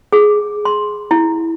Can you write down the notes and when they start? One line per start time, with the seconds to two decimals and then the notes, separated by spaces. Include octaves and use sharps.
0.12 G#4
0.65 C6
1.11 E4